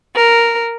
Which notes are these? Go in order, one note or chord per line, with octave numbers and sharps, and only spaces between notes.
A#4